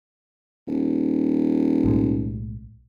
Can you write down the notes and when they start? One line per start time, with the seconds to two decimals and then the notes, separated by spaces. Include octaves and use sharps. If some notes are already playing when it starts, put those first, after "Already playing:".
0.67 D#1
1.84 B1 A2 G#3